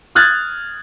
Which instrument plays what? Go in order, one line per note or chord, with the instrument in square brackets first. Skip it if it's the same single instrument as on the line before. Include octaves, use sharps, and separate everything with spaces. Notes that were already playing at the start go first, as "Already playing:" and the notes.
[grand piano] D#6 F6 F#6 G#6 A6